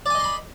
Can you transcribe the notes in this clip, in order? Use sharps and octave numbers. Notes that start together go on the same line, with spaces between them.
D5 D#5 G#5 B5 C6